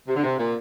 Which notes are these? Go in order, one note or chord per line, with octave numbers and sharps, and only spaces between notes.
C3
D3
C3
A#2